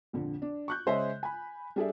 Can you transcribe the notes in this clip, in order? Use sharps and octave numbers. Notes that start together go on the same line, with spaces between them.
A#1 F2 D3
D4
C#6 F#6 G6
C#3 G#3 C5 C#5 D#5 E5
G#5 B5
G3 D4 G#4 A4 D5 E5